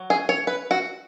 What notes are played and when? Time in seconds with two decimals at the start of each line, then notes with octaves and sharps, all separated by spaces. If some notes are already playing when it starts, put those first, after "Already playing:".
Already playing: F#3
0.10 G#4
0.29 C#5
0.47 B4
0.71 F#4